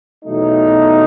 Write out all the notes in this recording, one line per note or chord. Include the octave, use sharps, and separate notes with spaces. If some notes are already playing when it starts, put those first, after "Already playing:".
E2 B2 F#3 A3 D#4